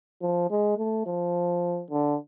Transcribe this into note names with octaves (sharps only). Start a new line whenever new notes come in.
F3
G#3
A3
F3
D3